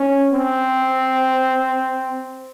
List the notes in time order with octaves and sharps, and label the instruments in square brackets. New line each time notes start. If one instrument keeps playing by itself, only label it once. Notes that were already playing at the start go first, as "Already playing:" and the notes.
Already playing: [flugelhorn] C#4
C4